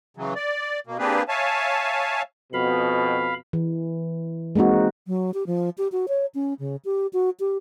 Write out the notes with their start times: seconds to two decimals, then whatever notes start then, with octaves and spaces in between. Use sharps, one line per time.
0.17 C#3 E3 F#3
0.36 D5
0.87 B2 A#3
0.99 A#3 C4 D4 G4 G#4 B4
1.29 C#5 E5 F5 G#5 A5
2.53 F2 B2 F5 B5
3.53 E3
4.55 G#3 A#3 C4 D#4 F#4
5.07 F#3
5.34 G4
5.47 F3
5.78 G4
5.92 F#4
6.08 C#5
6.35 C#4
6.59 C#3
6.85 G4
7.13 F#4
7.40 G4